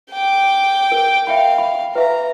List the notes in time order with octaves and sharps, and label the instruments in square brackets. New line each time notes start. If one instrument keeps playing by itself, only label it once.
[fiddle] G5 D6
[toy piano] A#4
[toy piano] E5 G5 B5 [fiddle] F5
[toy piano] B5
[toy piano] B4 E5 F5 [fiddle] A#5